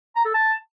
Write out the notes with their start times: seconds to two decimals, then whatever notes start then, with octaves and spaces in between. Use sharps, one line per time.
0.16 A#5
0.25 A4
0.34 A5